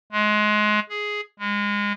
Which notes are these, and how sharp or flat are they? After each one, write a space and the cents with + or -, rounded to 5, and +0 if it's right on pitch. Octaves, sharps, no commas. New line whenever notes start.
G#3 +25
G#4 +5
G#3 -25